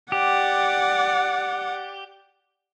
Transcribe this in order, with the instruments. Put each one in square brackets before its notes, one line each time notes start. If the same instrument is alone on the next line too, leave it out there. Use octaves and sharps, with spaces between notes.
[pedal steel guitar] G4 [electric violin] D5 F#5